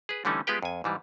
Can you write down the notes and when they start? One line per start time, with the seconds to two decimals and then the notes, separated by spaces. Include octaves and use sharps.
0.09 G#4 B4
0.25 D3 E3 G3 A3 C#4 D#4
0.47 G#3 B3 F4 G4 B4 G5
0.63 F2 G#5
0.84 G#2 E3 G3